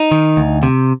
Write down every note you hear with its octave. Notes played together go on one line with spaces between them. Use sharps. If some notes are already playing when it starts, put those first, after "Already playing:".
Already playing: D#4
D#3
D2
C3